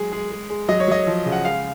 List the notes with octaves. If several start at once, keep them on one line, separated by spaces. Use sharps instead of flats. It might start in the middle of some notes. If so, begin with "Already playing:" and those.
Already playing: F#3 G#3 G#4
G#3 G#4
G#3
G#3
F#3 D#5
C#5
F#3 D#5
F3
C#3
F#5
G#3 F5